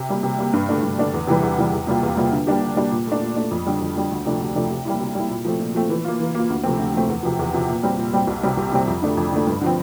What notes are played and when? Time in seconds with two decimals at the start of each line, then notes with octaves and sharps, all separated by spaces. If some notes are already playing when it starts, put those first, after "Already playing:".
Already playing: C3
0.09 G3 A#3
0.23 C3
0.39 G3 A#3
0.53 G2
0.69 D3 A3 D4
0.83 G2
0.98 D3 A3 D4
1.13 E2
1.27 C3 E3 G3
1.43 E2
1.58 C3 E3 G3
1.73 E2
1.87 C3 G3 A#3 F4
2.03 E2
2.17 C3 G3 A#3 F4
2.32 D3
2.47 G3 A#3 D4 G4
2.62 D3
2.77 G3 A#3 D4 G4
2.91 A#2
3.07 A3 D4
3.21 A#2
3.36 A3 D4
3.51 F2
3.67 D3 G3
3.81 F2
3.96 D3 G3
4.11 D2
4.25 C3 F3 A3 D4
4.41 D2
4.55 C3 F3 A3 D4
4.70 C3
4.85 G3 A#3 E4
5.00 C3
5.15 G3 A#3 E4
5.30 A#2
5.45 F3 A3 C4
5.60 A#2
5.75 F3 A3 C4
5.90 E3
6.05 A#3 F4
6.20 E3
6.35 A#3 F4
6.50 D2
6.63 C3 F3 A3 C4
6.79 D2
6.93 C3 F3 A3 C4
7.08 E2
7.23 C3 F3
7.39 E2
7.54 C3 F3
7.69 A#2
7.83 G3 C4
7.98 A#2
8.13 G3 C4
8.27 C2
8.43 C3 G3 C4
8.57 C2
8.72 C3 G3 C4
8.88 F2
9.02 D3 A3 D4
9.17 F2
9.32 D3 A3 D4
9.47 G2
9.61 D3 F3 C4